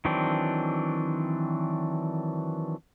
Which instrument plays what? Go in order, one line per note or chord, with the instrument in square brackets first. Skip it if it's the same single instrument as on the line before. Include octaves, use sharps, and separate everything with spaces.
[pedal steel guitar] D#3 E3 F#3 C4 D4